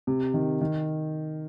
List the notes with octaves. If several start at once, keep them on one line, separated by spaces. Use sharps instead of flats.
C3
D#3
D#3